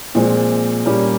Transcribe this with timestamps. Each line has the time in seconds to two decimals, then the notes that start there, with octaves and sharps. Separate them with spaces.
0.15 A#2 F3 G#3 C4
0.86 A#2 G3 A#3 C#4